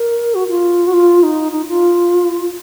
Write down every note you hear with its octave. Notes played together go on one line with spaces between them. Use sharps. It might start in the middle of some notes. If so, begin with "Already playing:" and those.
Already playing: A#4
F#4
F4
F#4
F4
D#4
D#4
F4